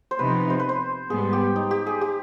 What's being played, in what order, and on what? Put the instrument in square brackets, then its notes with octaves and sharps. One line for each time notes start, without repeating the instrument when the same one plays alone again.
[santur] C5
[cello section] C3 F3 B3 D#4 [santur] B4
[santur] C5
B4
C5
[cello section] G#2 G3 B3 [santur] G#4
[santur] G4
D#4
G4
G#4
G4